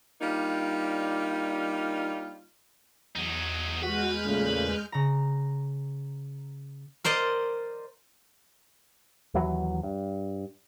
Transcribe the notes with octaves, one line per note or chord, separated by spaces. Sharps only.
G3 A#3 D4 D#4 F4
E2 F#3 D#4
G#3 F#4 B4 F6 G6
A#2 C#3 A3
C#3 A#5
A#4 C5 D5 D#5
D#2 E3 F#3
G2